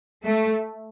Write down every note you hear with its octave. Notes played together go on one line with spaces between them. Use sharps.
A3